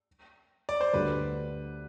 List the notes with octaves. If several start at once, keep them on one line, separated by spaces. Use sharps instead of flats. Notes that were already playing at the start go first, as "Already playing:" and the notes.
D5
C5
D2 D3 G3 B4